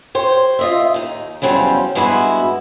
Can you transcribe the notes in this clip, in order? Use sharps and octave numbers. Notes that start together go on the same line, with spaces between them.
G4 C5 C#5
F4 D#5 E5
D#2 D#4
E2 F#3 G3 C#4 C5 F5
G2 G#3 B3 E4 F#4